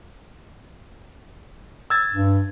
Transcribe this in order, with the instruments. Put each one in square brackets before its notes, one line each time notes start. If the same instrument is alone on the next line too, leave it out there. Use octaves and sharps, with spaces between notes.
[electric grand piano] E6 G#6 A6
[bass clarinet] G2